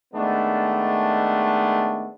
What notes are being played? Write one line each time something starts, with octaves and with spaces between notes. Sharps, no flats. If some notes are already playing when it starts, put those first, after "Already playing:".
D#3 G#3 A3 B3 D4